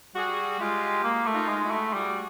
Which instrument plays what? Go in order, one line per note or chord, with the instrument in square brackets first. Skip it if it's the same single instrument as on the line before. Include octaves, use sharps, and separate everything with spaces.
[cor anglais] G3 [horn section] F#4 G#4
[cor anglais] G#3 [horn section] F4 G4
[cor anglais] A#3
A3
[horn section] D#4 F4
[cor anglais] G#3
[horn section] E4 F#4
[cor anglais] A3
[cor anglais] G3 [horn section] F#4 G#4